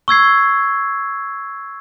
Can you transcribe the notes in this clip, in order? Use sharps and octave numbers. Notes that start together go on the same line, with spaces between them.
C#6 E6 G#6 C7